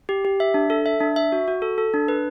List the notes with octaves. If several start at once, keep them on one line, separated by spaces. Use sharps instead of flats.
G4
G4
E5
D4
A4
E5
D4
E5
F#4
F#4
A4
A4
D4
B4